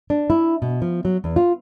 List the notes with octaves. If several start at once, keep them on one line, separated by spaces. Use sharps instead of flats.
D4
E4
B2
F3
F#3
E2
F4